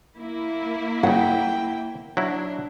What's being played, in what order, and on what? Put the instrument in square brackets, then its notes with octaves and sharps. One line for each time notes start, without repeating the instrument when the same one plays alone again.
[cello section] A#3 E4
[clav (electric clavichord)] C#3 F#3 [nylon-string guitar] F#5 [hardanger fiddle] G5
[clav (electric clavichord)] F#3 E4 [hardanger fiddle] D4